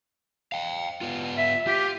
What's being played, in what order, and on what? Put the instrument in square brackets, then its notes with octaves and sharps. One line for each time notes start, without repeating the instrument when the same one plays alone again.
[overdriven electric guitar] F5 G5
B3 F4
[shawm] E5
[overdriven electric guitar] F4 [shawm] G4